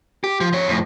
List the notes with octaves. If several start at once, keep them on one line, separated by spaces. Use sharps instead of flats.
G4
F3
F3 C#5
F2 A2